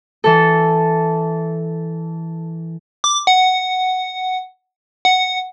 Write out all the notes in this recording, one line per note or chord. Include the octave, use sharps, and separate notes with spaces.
E3 A4
D6
F#5
F#5